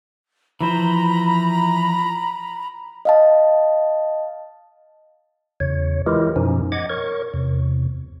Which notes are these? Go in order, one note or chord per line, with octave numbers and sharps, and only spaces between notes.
E3 F3 C5 A#5 B5
D#5 F5 A5
E2 C#3 C#5
E3 G#3 E4 F4 G4 A#4
F#2 B2 F3 C#4 D#4
D#5 F#5 D6 G#6
A#4 C#5 C#6
E2 C3